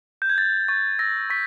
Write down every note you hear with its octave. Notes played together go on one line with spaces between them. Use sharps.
G6
G#6
G6 A6
C#6 A6
E6 A#6
C#6 B6